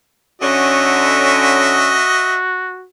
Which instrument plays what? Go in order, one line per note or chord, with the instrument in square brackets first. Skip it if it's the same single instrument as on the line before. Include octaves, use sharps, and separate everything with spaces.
[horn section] D3 C#4 [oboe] F#4 [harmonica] D#5 E5